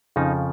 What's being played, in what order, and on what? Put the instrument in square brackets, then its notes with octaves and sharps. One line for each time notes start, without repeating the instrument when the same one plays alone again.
[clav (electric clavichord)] F2 C#3 F3 D#4